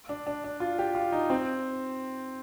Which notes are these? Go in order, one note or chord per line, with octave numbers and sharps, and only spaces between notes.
D4
D4
D4
F4
G4
F4
D#4
C4